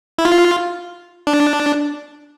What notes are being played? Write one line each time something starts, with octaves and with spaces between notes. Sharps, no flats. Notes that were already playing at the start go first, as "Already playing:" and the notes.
E4
F4
D4